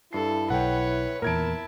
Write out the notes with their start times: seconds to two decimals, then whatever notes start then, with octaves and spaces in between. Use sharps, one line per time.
0.13 G2 E4 A4 C7
0.50 B1 B4 C#5 F#5 G5
1.22 E2 A#2 E4 A#4 A5 G#6 D7